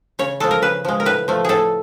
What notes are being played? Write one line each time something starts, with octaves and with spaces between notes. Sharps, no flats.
C#3 C#5
F3 G#3 A4
A#4
C#3 B4
F3 G#3
A#4
A2 B4
F3 A3
A2 G#4 A4